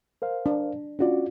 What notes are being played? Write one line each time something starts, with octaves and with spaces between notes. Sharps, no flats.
A#4 C5 F5
D4
C#4 D4 F4 F#4 D5